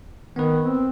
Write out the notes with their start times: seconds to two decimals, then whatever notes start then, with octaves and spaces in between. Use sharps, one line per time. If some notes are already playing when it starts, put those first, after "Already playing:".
0.36 D#3 B3 B4
0.65 C4